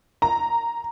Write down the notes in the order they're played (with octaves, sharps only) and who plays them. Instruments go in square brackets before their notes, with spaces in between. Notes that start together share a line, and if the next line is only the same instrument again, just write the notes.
[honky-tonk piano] A#5